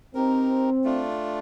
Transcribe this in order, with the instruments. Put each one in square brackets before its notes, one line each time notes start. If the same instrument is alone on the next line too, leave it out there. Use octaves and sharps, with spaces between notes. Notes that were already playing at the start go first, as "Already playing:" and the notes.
[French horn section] C4 [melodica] D#4 G4 A#4
[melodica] A3 D4 F4